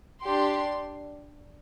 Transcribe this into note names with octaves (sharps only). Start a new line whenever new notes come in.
D4 G4 C6